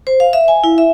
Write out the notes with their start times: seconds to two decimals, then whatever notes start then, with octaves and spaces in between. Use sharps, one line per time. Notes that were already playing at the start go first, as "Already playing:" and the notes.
0.07 C5
0.20 F5
0.33 E5
0.48 G#5
0.64 E4
0.78 E5